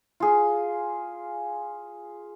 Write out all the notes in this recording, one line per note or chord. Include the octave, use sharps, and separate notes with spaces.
F4 G#4